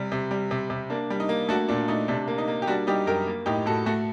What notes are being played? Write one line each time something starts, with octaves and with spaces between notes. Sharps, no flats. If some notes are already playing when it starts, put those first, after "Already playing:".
Already playing: C3 G3
C3
G3
C3
C3
A#3 D4
G3
D#4
A#3
A3 D4 F#4
A#2 D4
A3 D#4
C3 D4
A#3
D#4
A#3
G4
G3 D4 F#4
G3 D#4 G4
F#2 G4 A#4
A#3
A2 D#4 G4
A2 F#4 A4
A3 F#4 A4